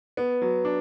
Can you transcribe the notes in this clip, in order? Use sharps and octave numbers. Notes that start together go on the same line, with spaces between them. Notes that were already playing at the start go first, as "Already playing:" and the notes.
B3
F#3
D4